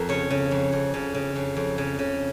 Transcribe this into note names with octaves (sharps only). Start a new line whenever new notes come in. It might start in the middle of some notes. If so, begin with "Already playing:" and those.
Already playing: F2 A#4
C#3 C#5
C#3
F2
F2
C#3
C#3
F2
F2
C#3
C#3